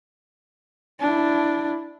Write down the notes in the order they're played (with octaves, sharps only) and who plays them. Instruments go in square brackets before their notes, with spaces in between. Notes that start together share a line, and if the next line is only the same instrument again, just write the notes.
[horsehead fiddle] D4 E4